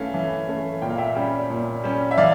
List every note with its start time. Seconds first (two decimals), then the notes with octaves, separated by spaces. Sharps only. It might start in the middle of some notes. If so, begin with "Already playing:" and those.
Already playing: E3 A3 C#4 F5
0.14 E3
0.47 A3 C#4
0.82 A#2 G5
0.90 F5
0.98 E5 G5
1.15 G3 C#4
1.50 A#2
1.84 G3 C#4
2.11 E5
2.17 E3 D5 F5